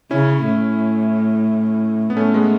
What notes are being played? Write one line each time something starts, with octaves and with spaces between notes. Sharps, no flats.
C#3 C#4 E4
A2
B3
A2 A3 C#4
G#3 B3